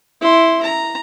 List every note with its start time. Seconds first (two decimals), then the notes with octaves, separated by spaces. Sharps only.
0.21 E4 C6
0.63 A#5